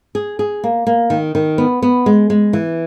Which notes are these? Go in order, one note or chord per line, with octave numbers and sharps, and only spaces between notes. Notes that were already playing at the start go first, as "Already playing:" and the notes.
G#4
G#4
A#3
A#3
D#3
D#3
B3
B3
G#3
G#3
E3